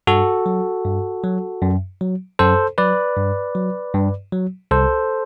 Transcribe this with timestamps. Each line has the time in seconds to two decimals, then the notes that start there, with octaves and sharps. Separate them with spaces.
0.07 G2 F#4 A4
0.46 F#3
0.84 G2
1.24 F#3
1.62 F#2
2.01 F#3
2.39 F#2 A4 C5
2.78 F#3 B4 D5
3.17 G2
3.55 F#3
3.94 G2
4.32 F#3
4.71 C2 A4 C5